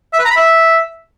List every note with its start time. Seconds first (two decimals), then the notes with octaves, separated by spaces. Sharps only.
0.13 E5
0.19 B4
0.24 A#5
0.30 B5
0.36 E5